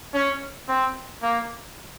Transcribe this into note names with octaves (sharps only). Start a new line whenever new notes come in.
C#4
C4
A#3